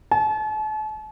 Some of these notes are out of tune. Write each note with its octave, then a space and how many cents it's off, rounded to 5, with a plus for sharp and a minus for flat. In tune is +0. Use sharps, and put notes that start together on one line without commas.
A5 -40